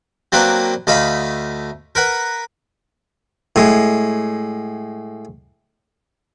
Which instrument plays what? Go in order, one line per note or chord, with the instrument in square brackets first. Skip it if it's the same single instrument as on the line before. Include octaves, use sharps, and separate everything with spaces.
[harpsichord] F#3 A#3 C4 D4 B4
D2 A3 D#5 F5 B5
A#4 B4 F#5
A2 G#3